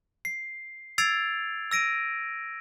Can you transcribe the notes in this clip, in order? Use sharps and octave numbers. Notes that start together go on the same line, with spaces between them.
C7
E6 G#6 A6 C7 D7 F7
E6 A#6 D7 D#7